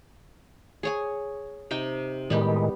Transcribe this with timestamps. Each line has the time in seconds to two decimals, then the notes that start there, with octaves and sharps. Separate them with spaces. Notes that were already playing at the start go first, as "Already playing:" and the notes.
0.83 G#4 C#5 G#5
1.71 C3 D#4 G5
2.30 A2 D#3 G3 G#3 B3 G4